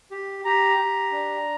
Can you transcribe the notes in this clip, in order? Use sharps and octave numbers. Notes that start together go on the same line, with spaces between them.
G4
G4 A#5
G4
D4